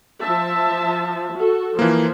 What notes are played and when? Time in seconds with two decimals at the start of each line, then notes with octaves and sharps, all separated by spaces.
0.22 F3 E5 A5
1.35 F#4 A4
1.79 E3 F3 A#3